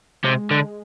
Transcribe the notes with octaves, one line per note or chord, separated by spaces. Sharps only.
C3 G#3
D3